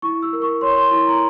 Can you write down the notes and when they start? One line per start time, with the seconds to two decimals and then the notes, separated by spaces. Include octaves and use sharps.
0.02 E4 C#6
0.22 E6
0.33 A#4
0.42 C#6
0.61 C#5 C6
0.76 C6
0.91 E4 C6
1.07 A#5